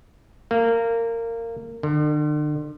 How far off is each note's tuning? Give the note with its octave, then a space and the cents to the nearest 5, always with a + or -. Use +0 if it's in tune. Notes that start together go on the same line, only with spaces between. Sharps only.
A#3 -20
D3 +40